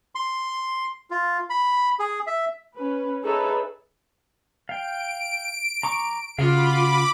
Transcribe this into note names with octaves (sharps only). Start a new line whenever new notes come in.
C6
F4
B5
G#4
E5
C#4 B4
D#4 G#4 A4 B4 C#5 E5
F5 G5 D7
A#5 C#6 D6
C#3 F4 F#4 F5 B5 D6